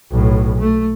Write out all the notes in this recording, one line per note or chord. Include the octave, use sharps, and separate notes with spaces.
B1 A2
A3